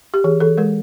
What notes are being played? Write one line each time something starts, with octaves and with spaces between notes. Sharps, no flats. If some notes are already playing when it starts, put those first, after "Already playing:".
G4
E3 G#4
E3 A4
G#3 A#4